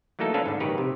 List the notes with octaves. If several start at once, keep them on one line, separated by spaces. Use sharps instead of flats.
E3 F#3 A3 A#3 D#4 A4
C#4 D4 A4 B4 C5 F5
G#2 D3
A#1 D#3 G4 A#4 B4 C#5
C3